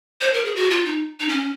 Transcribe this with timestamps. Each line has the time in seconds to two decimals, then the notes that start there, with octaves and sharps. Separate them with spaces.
0.21 C5
0.33 A#4
0.45 G#4
0.56 F#4
0.70 F4
0.85 D#4
1.20 D#4
1.29 C#4